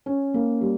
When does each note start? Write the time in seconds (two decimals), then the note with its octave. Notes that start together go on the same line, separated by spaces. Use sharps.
0.06 C#4
0.34 A#3
0.61 G3